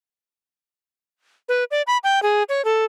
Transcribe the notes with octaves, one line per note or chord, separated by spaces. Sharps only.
B4
D5
B5
G5
G#4
C#5
A4